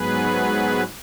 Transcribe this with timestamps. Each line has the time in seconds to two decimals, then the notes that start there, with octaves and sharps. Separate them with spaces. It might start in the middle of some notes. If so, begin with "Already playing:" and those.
Already playing: G#2 F#3 B3 G#4 B4